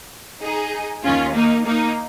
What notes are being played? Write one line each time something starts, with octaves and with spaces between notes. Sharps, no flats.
D#4 G#4
D#2 D#3 C#4 F4
A#3 D#4
A#3 D#4